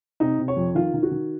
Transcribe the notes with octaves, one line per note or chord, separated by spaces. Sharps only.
C3 D#4
C3
C#5
F2
D#3 F4
D#3
F#4
D#3